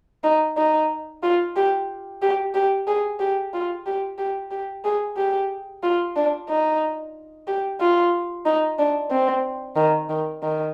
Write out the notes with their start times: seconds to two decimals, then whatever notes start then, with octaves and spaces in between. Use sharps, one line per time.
0.24 D#4
0.57 D#4
1.23 F4
1.56 G4
2.22 G4
2.54 G4
2.87 G#4
3.20 G4
3.53 F4
3.86 G4
4.18 G4
4.51 G4
4.85 G#4
5.17 G4
5.83 F4
6.16 D4
6.49 D#4
7.47 G4
7.80 F4
8.45 D#4
8.79 D4
9.10 C4
9.76 D#3
10.09 D#3
10.43 D#3